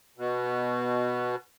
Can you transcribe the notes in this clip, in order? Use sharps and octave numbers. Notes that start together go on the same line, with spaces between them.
B2